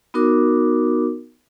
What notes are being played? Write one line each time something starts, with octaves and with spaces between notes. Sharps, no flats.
B3 D#4 F#4 A#4 D6